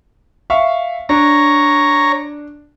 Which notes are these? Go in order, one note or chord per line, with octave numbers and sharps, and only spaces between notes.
E5 F5 C#6
D4 C#5 A#5